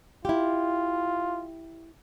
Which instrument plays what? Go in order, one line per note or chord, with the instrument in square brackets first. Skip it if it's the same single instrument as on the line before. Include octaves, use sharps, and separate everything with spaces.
[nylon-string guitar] E4 G4 [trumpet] F4